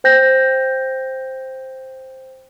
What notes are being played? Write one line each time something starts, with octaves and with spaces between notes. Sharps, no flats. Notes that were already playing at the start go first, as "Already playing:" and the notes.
C5 G5 G6 A#6